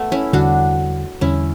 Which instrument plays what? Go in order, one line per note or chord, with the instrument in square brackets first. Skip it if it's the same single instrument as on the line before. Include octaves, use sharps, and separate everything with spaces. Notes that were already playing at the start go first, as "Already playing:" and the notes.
Already playing: [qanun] A3 B3
C#4 E4
[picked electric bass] E2 D3 G3 [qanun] D4 F#4
[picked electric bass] E2 D3 G3 [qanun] C#4 E4